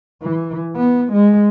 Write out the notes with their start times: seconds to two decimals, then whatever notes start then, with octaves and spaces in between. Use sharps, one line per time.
0.23 E3
0.76 B3
1.13 G#3